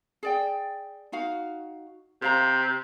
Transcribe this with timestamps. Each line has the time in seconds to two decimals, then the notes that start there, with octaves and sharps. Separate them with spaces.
0.23 G#4 D5 G5
1.12 D#4 F#4 F5
2.22 C3 C5 F5 A#5